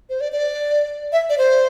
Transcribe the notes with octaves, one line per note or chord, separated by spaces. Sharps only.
C5
D5
D5
E5
D5
C5